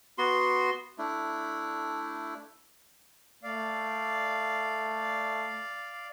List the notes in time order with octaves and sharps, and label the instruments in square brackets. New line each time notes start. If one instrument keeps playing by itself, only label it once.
[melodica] B3 F#4 C6
A3 D4 E4
[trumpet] A3 [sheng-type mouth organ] D5 F5